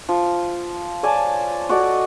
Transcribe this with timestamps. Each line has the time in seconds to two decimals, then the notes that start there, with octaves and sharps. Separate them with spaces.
0.09 F3
1.03 C#5 D5 G#5 A5
1.69 F#4 A4 D5 D#5